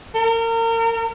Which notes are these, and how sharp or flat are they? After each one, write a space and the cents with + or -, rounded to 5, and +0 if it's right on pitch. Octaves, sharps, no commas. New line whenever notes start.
A#4 -30